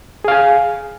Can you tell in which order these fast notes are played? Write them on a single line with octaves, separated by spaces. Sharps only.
G#4 F5 G#5